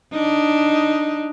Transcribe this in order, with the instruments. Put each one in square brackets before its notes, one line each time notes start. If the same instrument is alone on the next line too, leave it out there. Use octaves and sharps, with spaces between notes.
[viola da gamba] D4 D#4